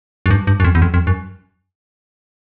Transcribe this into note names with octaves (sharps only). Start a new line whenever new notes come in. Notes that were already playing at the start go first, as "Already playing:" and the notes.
F#2
G2
G2
F#2
F2
E2
F2
F2
F#2